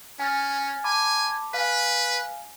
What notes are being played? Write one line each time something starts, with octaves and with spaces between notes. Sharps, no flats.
C#4 G#5 F6 A6
G#5 A5 B5 D6
B4 F5 G#5